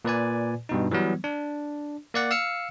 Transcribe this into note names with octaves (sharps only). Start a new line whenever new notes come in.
A#2 B4 D5 G#5
G2 B2 D#4
E3 F#3 G3 B3
D4
A#3 D5 F#5
F5 E6 F6 C#7